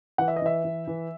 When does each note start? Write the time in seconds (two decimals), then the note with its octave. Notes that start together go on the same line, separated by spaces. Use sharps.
0.18 E3 F#5
0.28 E5
0.36 D#5
0.42 E3 E5
0.64 E3
0.87 E3